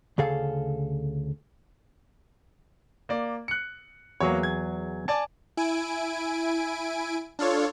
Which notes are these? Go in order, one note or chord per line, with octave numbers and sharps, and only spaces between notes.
D2 C#3 G#4 A4 F5
A#3 D5
F#6 C#7
E2 F#3 A#3 F#4 G#4 C#5
G#6
D5 G#5 A5
E4 G#5 D7
D4 F4 A4 C#5